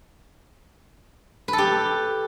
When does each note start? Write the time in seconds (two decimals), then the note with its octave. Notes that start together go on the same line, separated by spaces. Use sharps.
1.48 B4
1.53 A4
1.58 G4